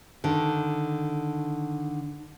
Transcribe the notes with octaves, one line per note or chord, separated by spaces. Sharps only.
D3 D#3